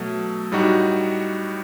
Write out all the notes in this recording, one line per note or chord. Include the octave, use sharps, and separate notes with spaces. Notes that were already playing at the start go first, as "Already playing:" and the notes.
Already playing: B2 F#3 A3
A2 G3 D#4 F#4